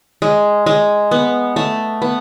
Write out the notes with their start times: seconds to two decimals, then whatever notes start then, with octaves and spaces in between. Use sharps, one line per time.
0.22 G#3
0.66 G#3
1.11 B3
1.56 A3
2.02 B3